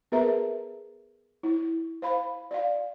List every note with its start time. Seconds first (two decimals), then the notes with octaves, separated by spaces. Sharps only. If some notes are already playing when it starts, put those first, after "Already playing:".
0.12 B3 G#4 A#4 B4 E5 A#5
1.43 E4
2.02 C5 F5 B5
2.51 D5 F5